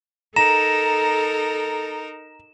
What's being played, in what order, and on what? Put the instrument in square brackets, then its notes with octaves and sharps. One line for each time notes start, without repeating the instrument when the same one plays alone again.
[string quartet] D#4 A#4 [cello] A4 [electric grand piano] A#5 [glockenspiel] E7